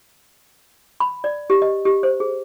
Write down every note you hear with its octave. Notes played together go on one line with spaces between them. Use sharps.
B5
D5
G4
D#5
G4
C5
G#4